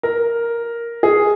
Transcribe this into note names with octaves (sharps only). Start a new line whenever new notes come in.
A#4
G#4